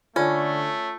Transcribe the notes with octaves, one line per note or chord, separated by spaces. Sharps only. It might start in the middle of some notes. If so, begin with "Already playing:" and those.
D3 A3 C#4 F4